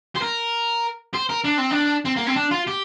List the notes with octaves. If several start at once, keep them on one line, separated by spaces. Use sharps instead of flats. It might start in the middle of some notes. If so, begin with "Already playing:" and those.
C5
A#4
C5
A#4
D4
C4
D4
C4
A#3
C4
D4
F4
G4